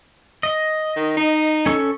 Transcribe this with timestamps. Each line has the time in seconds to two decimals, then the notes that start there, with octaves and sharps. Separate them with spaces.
0.43 D#5
0.96 D#3
1.17 D#4
1.66 C#4 A4 C#6